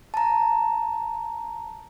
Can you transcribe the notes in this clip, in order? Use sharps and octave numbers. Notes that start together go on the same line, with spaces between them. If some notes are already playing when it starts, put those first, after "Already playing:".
A5 A#5